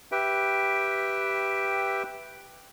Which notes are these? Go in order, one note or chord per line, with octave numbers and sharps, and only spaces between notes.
G4 B4 E5 G5